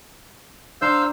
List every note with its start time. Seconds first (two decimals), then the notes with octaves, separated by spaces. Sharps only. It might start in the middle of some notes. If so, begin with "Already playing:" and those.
0.82 D4 C5 F5 A#5 E6 G6